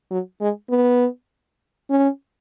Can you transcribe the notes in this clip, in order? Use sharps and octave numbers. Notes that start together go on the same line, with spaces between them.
F#3
G#3
B3
C#4